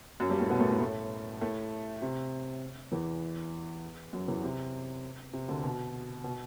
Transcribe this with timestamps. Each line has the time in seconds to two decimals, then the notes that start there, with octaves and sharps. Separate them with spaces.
0.20 F#2 F#3
0.30 G2 G3
0.40 A2 A3
0.50 B2 B3
0.60 A2 A3
0.70 A2 A3
0.81 A2 A3
1.41 A2 A3
2.02 C3
2.92 E2 E3
4.13 F#2 F#3
4.28 E2 E3
4.43 C3
5.33 C3
5.49 D2 D3
5.64 B2
6.24 B2